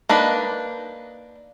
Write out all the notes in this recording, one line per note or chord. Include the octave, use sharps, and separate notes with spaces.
A#3 D4 D#4 B4